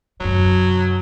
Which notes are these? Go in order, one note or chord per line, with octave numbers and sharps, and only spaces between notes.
F#2 C3 F#3